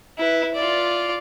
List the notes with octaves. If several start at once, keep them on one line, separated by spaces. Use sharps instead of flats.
E4 B4
F4 D5